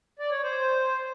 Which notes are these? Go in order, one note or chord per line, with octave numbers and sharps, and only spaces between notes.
D5
C#5
C5